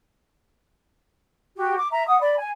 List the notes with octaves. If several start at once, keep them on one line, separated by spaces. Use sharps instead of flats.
F#4 G4
D6
E5 A#5
F#5 D#6
D5 B5
G#5